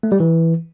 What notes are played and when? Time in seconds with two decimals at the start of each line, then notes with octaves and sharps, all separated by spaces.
0.03 A3
0.12 G3
0.20 E3